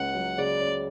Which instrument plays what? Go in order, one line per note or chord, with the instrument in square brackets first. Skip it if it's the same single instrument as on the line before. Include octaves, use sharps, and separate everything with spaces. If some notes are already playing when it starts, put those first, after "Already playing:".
Already playing: [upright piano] C#2 C#4 [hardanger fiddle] F#5
[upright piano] F#3
[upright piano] C#3 [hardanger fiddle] D5
[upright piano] C#4